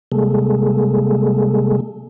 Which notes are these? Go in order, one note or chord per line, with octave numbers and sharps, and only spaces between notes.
C3 G3 G#3 A#3 G#4 A4